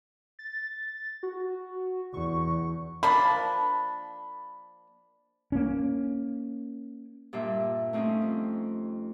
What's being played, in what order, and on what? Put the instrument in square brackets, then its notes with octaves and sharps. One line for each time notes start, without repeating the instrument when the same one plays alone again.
[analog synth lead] A6
F#4
[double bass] E2 [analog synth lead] C#6
[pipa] F3 A#3 D4 [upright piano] B5
[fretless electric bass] A#3 C#4
[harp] G2 A#2 G3 F4 E5
A3 C4 C#4 D#4 F4
F2